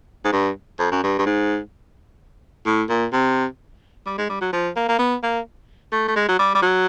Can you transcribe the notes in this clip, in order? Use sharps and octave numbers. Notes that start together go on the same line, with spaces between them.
G#2
G2
F2
F#2
G2
G2
G#2
A2
A#2
C3
G3
G#3
G3
F#3
F3
A#3
A#3
B3
A#3
A3
A3
G#3
F#3
G3
G3
F#3